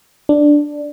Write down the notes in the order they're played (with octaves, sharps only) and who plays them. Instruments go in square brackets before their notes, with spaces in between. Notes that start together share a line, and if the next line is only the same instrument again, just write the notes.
[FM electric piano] D4